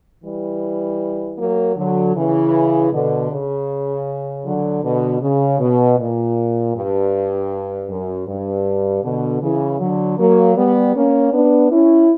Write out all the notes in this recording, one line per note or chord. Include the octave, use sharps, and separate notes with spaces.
E3 G3
F#3 A#3
D3 F#3
C#3 E3
B2 D3
C#3
D3 F#3
B2 D3
C#3
B2
A#2
G2
F#2
G2
B2 D3
C#3 E3
D3 F#3
F#3 A#3
G3 B3
A#3 C#4
B3 D4
C#4 E4